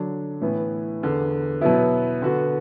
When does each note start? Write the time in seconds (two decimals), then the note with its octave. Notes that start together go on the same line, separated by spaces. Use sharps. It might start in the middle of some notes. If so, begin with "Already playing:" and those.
Already playing: D3 F#3 D4
0.41 A2 E3 B3
1.02 E2 D3 B3
1.61 B2 F#3 B3 E4
2.22 D3 B3 F#4